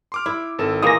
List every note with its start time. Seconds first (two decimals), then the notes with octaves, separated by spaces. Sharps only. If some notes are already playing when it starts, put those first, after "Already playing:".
0.12 C6 D6 F6
0.26 E4
0.59 G#1 A4 E7
0.82 A#2 E3 G#3 A#3 D#6 A#6